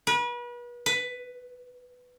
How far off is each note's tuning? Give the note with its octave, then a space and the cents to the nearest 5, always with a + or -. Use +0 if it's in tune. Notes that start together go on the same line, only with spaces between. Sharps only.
B4 -35
B4 +10